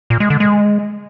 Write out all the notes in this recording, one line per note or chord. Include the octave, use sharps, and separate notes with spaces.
A#2
G#3
D3
G#3